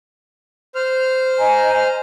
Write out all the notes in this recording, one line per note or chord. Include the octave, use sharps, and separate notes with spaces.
C5 F6
D#5 G#5 A#5